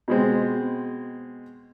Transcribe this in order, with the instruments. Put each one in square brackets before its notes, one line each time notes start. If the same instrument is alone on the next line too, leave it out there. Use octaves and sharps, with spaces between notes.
[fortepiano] B2 G#3 C4